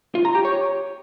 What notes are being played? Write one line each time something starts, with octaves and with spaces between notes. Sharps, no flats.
F4
A#5
G4
C#5